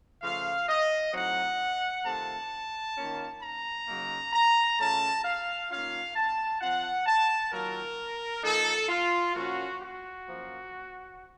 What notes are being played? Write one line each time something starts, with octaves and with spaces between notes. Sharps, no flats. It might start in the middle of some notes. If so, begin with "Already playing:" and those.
C#3 F3 A3 F5
D#5
A2 F#3 C4 D#4 F#5
C3 D#3 A3 C4 F4 A5
D#3 A#3 C#4 F4
A#5
C#3 F#3 A#3 D#4
A#5
C#3 A3 C#4 F4 A5
F5
D#3 A#3 C#4 F4 F5
A5
F3 C4 F4 F#5
A5
D#3 F#3 A#3 F4 A#4
F3 A#3 D#4 A4
F4
A#2 F3 A#3 C#4 F#4
F#4
F#2 F3 A#3